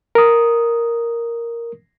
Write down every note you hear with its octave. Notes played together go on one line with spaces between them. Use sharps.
A#4 D#6